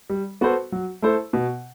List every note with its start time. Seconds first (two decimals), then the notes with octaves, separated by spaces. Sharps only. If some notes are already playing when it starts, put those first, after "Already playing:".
0.10 G3
0.41 B3 F#4 A4 C5
0.72 F#3
1.02 A3 E4 A4 C5
1.33 B2